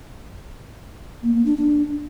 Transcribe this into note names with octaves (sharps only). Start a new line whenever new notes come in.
A#3
A#3
D4
D4